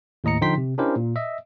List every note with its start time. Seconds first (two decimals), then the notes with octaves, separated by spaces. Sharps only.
0.24 D#2 A2 D#5 A#5 C#7
0.41 D3 F3 D#4 G5 C6 B6
0.58 C3
0.78 C#4 D4 E4 G4 A#4 C5
0.96 A#2
1.16 D#5 E5